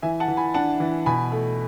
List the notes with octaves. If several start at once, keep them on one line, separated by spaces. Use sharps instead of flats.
E3 E5 G#5
F#5 A5
E3
G#5 B5
D4 F#5 A5
E3
B2 G#5 B5
A3